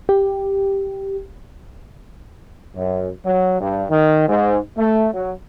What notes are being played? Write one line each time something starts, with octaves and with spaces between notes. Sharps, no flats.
G4
F#2
F#3
G2
D#3
G#2
A3
F#3